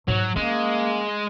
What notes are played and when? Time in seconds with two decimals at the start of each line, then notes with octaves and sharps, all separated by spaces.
0.08 G#2 F#3
0.36 G#3 A#3 C#4